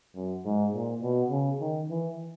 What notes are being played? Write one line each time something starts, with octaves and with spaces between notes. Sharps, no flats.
F#2
G#2
A#2
B2
C#3
D#3
E3